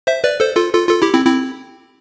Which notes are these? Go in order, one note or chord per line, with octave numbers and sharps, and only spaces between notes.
C5 E5
B4 D5
A4 C5
F4 A4
F4 A4
F4 A4
E4 G4
C4 E4
C4 E4